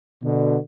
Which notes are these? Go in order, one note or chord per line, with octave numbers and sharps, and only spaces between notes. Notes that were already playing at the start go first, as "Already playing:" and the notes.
B2 D3